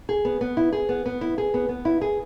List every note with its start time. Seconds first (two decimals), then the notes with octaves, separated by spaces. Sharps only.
0.09 G#4
0.25 B3
0.41 B3
0.57 E4
0.72 G#4
0.89 B3
1.06 B3
1.21 E4
1.38 G#4
1.54 B3
1.69 B3
1.85 E4
2.01 G#4